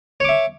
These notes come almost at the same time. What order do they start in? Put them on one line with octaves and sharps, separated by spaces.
C#5 D6 E5